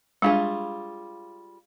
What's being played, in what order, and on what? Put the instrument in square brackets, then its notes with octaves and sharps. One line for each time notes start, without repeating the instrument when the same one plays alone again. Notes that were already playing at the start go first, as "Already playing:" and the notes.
[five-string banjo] G3 F4 G#4 [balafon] G#3 D4 [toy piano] F5 C#6